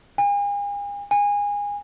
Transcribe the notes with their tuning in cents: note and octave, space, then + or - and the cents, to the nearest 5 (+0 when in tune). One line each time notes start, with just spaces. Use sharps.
G#5 -40
G#5 -25